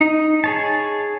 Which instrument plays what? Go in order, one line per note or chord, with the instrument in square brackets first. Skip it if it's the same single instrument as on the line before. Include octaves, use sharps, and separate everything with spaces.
[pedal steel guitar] D#4
G#4 C#5 A5